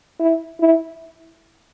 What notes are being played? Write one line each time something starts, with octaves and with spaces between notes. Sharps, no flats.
E4
E4